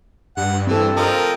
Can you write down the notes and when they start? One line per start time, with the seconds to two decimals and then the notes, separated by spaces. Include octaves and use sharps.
0.37 G2 F#5
0.67 E3 C4 A4
0.96 F3 A#4 D#5